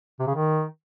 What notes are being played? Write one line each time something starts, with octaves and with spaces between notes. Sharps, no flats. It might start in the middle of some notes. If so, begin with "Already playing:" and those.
C3
C#3
D#3